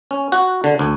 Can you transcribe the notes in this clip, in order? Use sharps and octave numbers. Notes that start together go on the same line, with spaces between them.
C#4
F#4
D3
D2